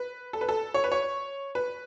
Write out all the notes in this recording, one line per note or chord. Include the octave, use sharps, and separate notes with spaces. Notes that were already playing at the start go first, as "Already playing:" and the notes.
Already playing: B4
A4
B4
A4
C#5
B4
C#5
B4